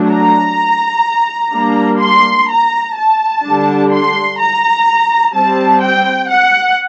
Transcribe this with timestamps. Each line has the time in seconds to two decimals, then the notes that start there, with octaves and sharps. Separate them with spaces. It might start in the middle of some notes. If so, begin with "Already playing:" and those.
Already playing: F#3 A3 D4
0.11 A#5
1.53 G3 A#3 D4
2.01 C6
2.50 A#5
2.97 A5
3.44 D3 G3 D4
3.92 C6
4.39 A#5
5.34 G3 C4 A5
5.82 G5
6.30 F#5